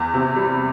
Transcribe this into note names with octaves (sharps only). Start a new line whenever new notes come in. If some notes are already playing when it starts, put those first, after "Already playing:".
Already playing: E2
C3
G3